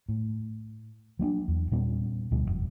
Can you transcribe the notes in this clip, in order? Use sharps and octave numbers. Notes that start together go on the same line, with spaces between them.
A2
F#3 A#3 C4 D4
E2
A#2 G3 B3 C#4
D2 B2 G3
F#1 B1 F2